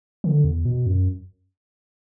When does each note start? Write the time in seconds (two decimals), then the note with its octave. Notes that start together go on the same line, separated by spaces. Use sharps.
0.24 D3
0.44 E2
0.65 B2
0.86 F#2